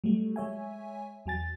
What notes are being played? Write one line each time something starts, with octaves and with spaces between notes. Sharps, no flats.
F#3 G3 A3
G#3 C#5 E5 G#5
E2 F#3 G#5 A6